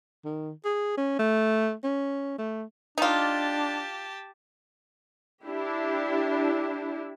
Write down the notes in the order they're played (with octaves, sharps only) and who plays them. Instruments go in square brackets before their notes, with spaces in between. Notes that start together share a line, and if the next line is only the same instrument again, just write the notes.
[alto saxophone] D#3
G#4
C#4
A3
C#4
A3
[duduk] D4 [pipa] D#4 F4 [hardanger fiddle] G4 A5
[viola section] D4 E4 G4